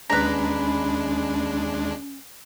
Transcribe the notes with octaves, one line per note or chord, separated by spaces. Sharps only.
D#2 G#3 C#4 D4 B4 A#5